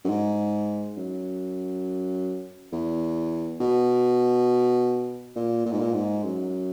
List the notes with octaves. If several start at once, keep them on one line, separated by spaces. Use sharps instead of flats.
F#2
G#2
F#2
E2
B2
A#2
A#2
G#2
A#2
G#2
F#2